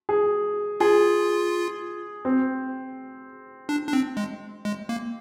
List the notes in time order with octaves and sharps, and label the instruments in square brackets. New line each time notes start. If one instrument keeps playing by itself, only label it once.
[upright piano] G#4
[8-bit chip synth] F4 [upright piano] G#4
[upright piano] C4
[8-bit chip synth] D4
D4
C4
G#3
G#3
A#3